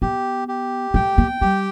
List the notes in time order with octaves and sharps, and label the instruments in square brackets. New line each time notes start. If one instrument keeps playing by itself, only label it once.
[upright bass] B3 [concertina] G4
[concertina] G4
[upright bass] A3 [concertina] G5
[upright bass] B3
[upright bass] G3 [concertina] G4